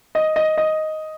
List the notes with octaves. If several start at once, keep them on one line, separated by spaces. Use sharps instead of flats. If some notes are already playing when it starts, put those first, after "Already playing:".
D#5
D#5
D#5